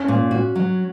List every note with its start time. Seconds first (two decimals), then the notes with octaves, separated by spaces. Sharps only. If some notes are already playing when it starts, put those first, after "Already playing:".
Already playing: C#4
0.08 A#2
0.31 F#4
0.56 F#3